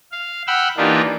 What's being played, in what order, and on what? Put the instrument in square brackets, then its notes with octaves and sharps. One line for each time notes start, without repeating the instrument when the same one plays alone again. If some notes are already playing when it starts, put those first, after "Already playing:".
[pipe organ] F5
F#5 G5 B5 E6 F6
E3 A#3 D4 D#4 F4 G4